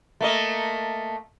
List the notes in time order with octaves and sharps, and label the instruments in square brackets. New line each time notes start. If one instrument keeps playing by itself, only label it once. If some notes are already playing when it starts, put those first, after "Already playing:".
[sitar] A3 A#3 D#5